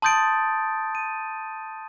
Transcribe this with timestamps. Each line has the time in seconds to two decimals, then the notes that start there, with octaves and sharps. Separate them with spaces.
0.02 A5 C6 D#6 G6 A6 D7
0.95 D#7